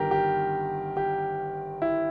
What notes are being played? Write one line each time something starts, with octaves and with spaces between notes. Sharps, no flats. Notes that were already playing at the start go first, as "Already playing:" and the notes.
Already playing: G1 G2 D#3 G4 A#4
G4
G4
E4